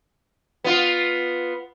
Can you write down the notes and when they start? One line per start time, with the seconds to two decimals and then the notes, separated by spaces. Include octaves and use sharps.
0.64 B3 F4